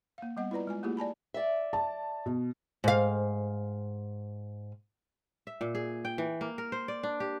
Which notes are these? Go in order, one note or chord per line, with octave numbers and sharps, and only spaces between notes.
A#3 F5
G3 B3 D#5 F#5
E4 F4 B4 D5 A#5
G#3 F4 G#5
A3 A#3 E4 F4 G4 G#4
D5 G#5 A5 B5
D5 E5
A5
B2
G#2 F5
E5
A#2
G#4
G5
E3
A#3
A#4
C5
D5
D4
G4